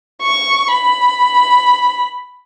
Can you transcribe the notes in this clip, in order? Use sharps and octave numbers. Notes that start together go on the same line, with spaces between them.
C#6
B5